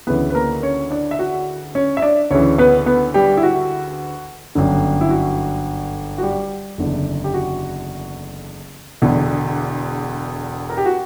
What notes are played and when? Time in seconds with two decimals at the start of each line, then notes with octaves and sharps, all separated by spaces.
0.07 D2 C#3 E3 B3 B4
0.30 B4
0.35 A#3 A#4
0.63 C#4 C#5
0.90 D4 D5
1.11 E5
1.19 F#4 F#5
1.75 C#4 C#5
1.97 E5
2.02 D4 D5
2.30 D2 C#3 E3 C#4 C#5
2.58 B3 B4
2.86 B3 B4
3.14 G3 G4
3.37 E4
3.43 F#4
4.55 G1 F#2 D3
5.01 E4
5.10 F#4
6.18 F#4
6.23 G3 G4
6.78 F#1 E2 D3
7.24 G4
7.34 F#4
9.02 E1 E2 D3
10.70 A#4
10.78 G4
10.86 F#4